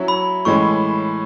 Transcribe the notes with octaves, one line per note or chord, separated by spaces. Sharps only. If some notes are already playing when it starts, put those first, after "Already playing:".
Already playing: F#3 C#4 E4
B5
A2 E3 G#3 C#4 C#6